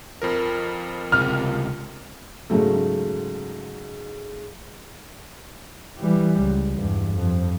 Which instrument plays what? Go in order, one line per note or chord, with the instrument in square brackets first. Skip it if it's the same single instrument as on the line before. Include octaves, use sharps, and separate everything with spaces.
[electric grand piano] F2 F3 A#4
[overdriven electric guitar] C#2 C3 [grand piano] F6
[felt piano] G#2 C#3 F#3 A3
[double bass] E3 G3
C#2
E2 G2
F2